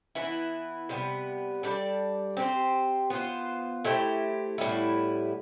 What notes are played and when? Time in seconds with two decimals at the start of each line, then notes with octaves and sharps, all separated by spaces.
0.15 E3 B3 E4
0.89 C3 G3 B3
1.63 G3 D4 A4 D5
2.37 C4 G4 C5
3.10 B3 F4 C5
3.85 A3 E4 G4 C5
4.58 A2 G3 B3 E4